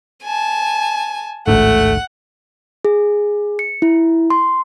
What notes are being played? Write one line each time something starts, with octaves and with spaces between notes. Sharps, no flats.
G#5 A5
A1 D2 G#2 A3 F#5
G#4
C#7
E4
C6